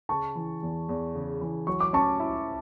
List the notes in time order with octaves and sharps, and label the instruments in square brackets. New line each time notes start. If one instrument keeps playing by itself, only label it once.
[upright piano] C#3 [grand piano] A5 C#6
[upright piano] E3
E2
E2
C#3
E3
[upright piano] F#3 [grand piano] C#6
[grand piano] D6
[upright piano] C#4 [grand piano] A5 C#6
[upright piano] E4